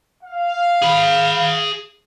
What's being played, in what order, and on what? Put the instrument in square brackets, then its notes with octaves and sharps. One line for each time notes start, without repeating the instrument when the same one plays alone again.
[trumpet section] F5
[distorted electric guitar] G#4 B5